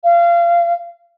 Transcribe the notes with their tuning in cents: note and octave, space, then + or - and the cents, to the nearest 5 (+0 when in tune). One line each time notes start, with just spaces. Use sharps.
F5 -25